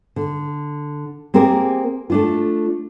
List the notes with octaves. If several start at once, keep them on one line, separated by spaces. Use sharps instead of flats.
D3
A#3 C4 G4 G#4 A#4
A3 D4 F4